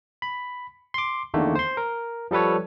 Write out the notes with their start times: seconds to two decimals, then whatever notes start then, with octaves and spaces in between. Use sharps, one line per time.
0.22 B5
0.94 C6 D6
1.34 E2 D3 D#3 A3 A#3
1.55 C5 C6
1.77 A#4
2.31 F3 G3 A4 B4 C#5